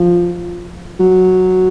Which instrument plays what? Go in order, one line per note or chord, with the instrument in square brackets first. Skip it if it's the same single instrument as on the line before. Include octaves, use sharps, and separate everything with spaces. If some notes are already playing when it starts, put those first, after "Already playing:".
Already playing: [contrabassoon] F3
F#3